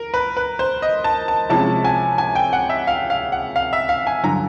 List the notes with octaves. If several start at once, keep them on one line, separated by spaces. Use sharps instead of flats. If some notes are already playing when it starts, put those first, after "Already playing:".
Already playing: A#4
B4
B4
C5
D#5
A5
A5
C3 F3 G#3 C#4 E4 A5
G#5
G#5
G5
F#5
E5
F5
F5
F#5
F5
E5
F5
G#5
G2 D3 F#3 A#5